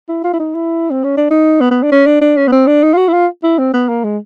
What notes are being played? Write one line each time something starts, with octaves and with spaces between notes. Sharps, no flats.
E4
F4
E4
D#4
E4
C4
C#4
D4
D#4
B3
B3
D4
C#4
D4
D4
C#4
B3
C4
D4
D#4
F4
F#4
E4
F4
E4
C4
B3
A#3
G#3